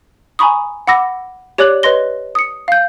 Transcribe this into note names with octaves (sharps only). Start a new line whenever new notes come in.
G#5 A#5 B5 C#6 D#6
F#5 B5 D6 E6 A#6
G4 C#5 D5 D6 F#6 F#7
B4 C#5 D#5 C6 A#6 G7
D#6 C#7
F5 G6